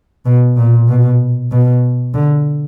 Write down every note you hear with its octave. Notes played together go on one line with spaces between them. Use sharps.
B2
A#2
B2
B2
D3